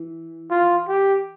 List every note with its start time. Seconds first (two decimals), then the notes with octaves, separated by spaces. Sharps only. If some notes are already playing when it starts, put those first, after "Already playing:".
Already playing: E3
0.51 F4
0.88 G4